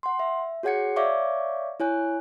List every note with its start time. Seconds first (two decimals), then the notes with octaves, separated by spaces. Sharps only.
0.03 F#5 C6
0.19 E5
0.63 F#4 G#4 C#5 F#5 G#6 C#7
0.96 C#5 D5 E5 F5 C#6 D6
1.80 E4 C#5 G#5 F#6